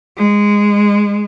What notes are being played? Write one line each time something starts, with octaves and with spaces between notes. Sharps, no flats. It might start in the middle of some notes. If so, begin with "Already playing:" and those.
G#3